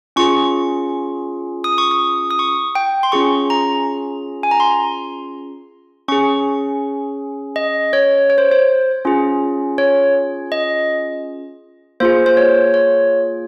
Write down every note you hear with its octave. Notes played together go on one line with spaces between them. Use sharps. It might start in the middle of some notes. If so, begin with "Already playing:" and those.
C#4 F4 G#4 C#6
D#6
C#6
D#6
D#6
C#6
G5
C6
C#4 F4 G#4 C#6
A#5
G#5
A#5
C6
C#4 G#4 C#6
D#5
C#5
C#5
C5
C5
C#4 F4 G#4
C#5
D#5
A#3 F4 G#4 C5
C5
C#5
C#5